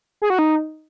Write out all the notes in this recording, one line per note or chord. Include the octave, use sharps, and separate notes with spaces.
G#4
F#4
D#4